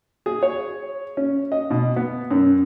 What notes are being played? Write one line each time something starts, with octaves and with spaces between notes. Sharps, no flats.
G#4
C#5
C#4
D#5
B2
B3
F#2